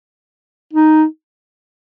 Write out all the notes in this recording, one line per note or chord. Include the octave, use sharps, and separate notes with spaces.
D#4